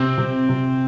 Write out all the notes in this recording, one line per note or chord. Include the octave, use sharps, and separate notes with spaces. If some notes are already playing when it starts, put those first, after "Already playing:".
Already playing: C3 C4
C3
C3